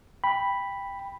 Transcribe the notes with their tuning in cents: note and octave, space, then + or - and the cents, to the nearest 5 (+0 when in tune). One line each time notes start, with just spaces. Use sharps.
G5 +15 B5 +0